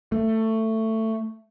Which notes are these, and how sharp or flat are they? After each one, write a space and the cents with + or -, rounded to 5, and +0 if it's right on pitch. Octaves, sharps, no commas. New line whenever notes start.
A3 +15